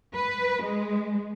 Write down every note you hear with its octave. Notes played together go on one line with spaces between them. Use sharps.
B4
G#3